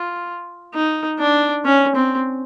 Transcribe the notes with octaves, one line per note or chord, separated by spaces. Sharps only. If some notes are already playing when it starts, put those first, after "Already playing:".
Already playing: F4
D#4
D4
C#4
C4